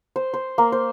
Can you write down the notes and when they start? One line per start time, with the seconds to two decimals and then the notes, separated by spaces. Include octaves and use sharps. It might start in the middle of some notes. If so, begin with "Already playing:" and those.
0.16 C5
0.34 C5
0.58 A#3
0.72 C5